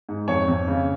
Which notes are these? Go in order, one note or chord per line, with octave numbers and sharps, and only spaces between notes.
G#2
F2 C#5
F2
C#3